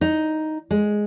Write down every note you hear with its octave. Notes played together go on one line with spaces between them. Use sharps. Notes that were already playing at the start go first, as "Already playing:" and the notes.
D#4
G#3